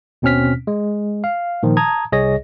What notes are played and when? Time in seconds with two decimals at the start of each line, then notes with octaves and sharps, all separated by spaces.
0.22 D#2 B2 C4 C#4 F6 B6
0.67 G#3
1.24 F5
1.63 A#2 D#3 F3
1.77 A5 A#5 D#6 G#6
2.12 C2 G#4 C#5 D#5 A#6